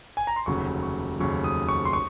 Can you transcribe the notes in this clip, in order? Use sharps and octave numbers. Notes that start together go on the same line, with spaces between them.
G#5
A#5
C6
F1 D#2 C#3 F#3 C#6
C#6
F1 D#2 C#3 F#3 C#6
D#6
C#6
C6
C#6